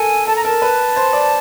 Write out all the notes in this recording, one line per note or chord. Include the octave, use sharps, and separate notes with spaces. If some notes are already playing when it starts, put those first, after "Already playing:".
Already playing: A4 A#4 G#5
A4 A5
A#5
A#4 A5
B4
C5
D5